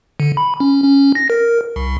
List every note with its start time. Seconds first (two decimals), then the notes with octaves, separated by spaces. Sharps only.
0.20 D3
0.37 B5
0.60 C#4
0.84 C#4
1.15 A#6
1.30 A#4
1.76 C2